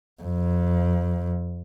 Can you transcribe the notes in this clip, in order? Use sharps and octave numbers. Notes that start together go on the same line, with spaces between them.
F2